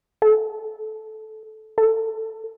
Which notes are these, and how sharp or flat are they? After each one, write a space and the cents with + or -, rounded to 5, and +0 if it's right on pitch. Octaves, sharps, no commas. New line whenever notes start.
A4 -15
A4 +25